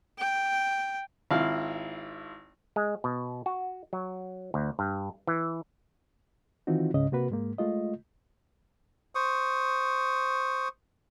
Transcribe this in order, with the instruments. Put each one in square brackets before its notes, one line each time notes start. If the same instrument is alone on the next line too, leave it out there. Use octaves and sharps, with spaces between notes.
[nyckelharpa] G5
[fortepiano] G#1 E4 F4 F5
[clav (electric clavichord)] G#3
B2
F#4
F#3
D2
G2
E3
[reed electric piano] D#3 E3 C4 D#4 F4 F#4
C#2 G#2 C#3 C#4 D#5
C3 A#3 F#4 B4
G#2 G#3 A#3
G#3 A3 F4 D#5
[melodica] C5 C#6 D#6